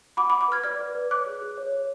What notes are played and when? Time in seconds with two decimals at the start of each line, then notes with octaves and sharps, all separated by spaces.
0.17 F#5 B5 D6
0.30 B5 D6
0.33 F#5
0.41 B5 D6
0.48 B4 F6 G#6
0.64 D5 F6 G#6
0.79 B4
0.95 B4
1.10 C#5 D6 F#6
1.26 G#4
1.41 G#4
1.58 C#5
1.72 C#5